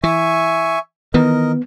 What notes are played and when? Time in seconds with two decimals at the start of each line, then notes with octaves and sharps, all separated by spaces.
0.04 E3 E5 G#5 C#6
1.14 D#3 E3 B3 A#4 D#5